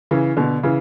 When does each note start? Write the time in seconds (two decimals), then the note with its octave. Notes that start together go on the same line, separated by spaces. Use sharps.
0.11 C#3 E3
0.37 B2 D3
0.63 C#3 E3